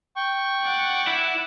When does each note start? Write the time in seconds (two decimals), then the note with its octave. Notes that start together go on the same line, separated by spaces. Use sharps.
0.16 G5 C#6
0.63 D5 F#5
1.07 E4